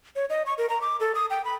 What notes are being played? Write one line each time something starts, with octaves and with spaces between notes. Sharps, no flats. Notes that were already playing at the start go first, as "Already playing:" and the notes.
C#5
D#5
C#6
A#4
A#5
D6
A4
D#6
G5
B5